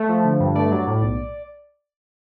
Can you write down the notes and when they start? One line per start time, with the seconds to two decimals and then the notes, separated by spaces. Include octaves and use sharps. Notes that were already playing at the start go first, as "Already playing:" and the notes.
Already playing: A3
0.09 F3
0.25 D3
0.40 G2
0.55 A3 D5
0.71 F#3
0.87 A2
1.02 B1